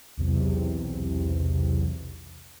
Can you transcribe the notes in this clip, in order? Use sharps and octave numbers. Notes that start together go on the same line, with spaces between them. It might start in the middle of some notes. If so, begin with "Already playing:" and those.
B1 E2 C3